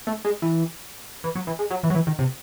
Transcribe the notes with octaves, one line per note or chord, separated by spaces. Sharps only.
A3
G#3
E3
E3
F#3
E3
G#3
F#3
E3
F#3
E3
D#3
C3